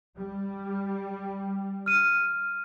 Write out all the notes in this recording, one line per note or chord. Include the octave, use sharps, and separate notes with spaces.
G3
F6 D#7